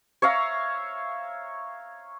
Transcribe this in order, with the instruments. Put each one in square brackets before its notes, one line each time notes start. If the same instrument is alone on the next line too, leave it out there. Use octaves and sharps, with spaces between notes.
[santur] C#5 E5 F5 A#5